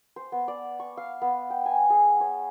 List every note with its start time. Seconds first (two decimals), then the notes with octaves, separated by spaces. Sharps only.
0.16 C5
0.32 B3
0.48 D5
0.80 C#6
0.97 F5
1.22 B3
1.50 G5
1.66 G#5
1.90 G#4
2.20 C#5